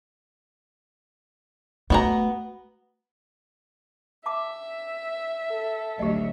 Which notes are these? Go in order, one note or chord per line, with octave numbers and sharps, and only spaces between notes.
A3 B3 F#4 A#5
E5 A5 D6
A4
G#1 D2 F#3 G4 D#5